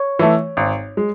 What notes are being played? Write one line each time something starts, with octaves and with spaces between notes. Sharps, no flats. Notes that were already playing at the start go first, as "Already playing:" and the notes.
Already playing: C#5
E3 A3
G#1
G#3